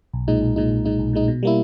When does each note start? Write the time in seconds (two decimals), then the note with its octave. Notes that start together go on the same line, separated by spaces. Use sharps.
0.13 B1
0.28 A#2 G#3 D#4
0.42 B1
0.56 A#2 G#3 D#4
0.71 B1
0.85 A#2 G#3 D#4
0.99 B1
1.13 A#2 G#3 D#4
1.28 B2
1.43 G3 A#3 E4